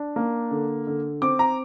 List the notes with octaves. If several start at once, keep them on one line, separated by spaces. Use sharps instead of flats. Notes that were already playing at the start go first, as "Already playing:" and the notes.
Already playing: D4
A#3
D3
D3
C4 D6
A#5